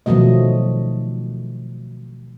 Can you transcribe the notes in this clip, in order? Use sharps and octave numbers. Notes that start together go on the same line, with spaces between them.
B2 D#3 F3 F#3 A3 D#5